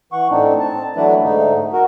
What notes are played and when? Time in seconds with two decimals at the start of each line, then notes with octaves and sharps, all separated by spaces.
0.12 E3 F#5 C#6
0.30 A2 C4 D4 D#4
0.60 C4 A5
0.96 E3 F#3 A3 D4 E4 B4
1.23 G#2 D3 A3 D#4
1.73 F#4 A#4